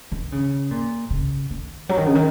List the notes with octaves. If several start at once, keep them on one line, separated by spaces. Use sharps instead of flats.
D#3
C#3
A#2
C#3
D#3
F#3
D#3
C#3
D#3